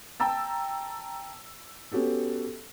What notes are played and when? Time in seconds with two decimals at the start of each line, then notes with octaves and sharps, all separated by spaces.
0.20 G5 A5 A#5 E6 A6
1.92 B3 C#4 F#4 G4 A4